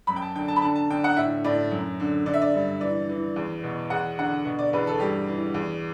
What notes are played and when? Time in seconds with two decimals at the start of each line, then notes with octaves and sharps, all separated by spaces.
0.07 F#2 B5
0.16 G5
0.22 A5
0.35 D3 G5
0.48 A5
0.56 B5
0.62 D3 A5
0.76 A5
0.90 D3 G5
1.04 F#5
1.17 A2 E5
1.44 A2 D5
1.72 F#2
2.00 D3
2.26 D3 D5
2.34 E5
2.42 D5
2.54 G2
2.81 E3 D5
3.09 E3
3.36 E2
3.63 B2
3.90 E2 F#5
4.18 D3 F#5
4.45 B2
4.59 D5
4.73 E2 B4
4.87 A4
5.00 G2 G4
5.28 E3
5.54 E2